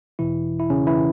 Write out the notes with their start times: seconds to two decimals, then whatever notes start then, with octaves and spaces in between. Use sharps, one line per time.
0.19 E2 B2 E3 E4
0.59 E4
0.70 C#3 C#4
0.87 E3 E4